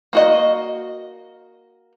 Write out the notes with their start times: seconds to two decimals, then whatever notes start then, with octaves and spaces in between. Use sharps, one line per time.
0.13 A#3 F#4 D#5